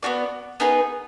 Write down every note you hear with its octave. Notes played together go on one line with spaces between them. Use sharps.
B3 D4 F#4 D5
B3 D#4 G#4 B4